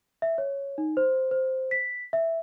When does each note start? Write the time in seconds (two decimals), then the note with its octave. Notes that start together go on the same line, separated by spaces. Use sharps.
0.22 E5
0.38 C#5
0.78 D#4
0.97 C5
1.31 C5
1.71 B6
2.13 E5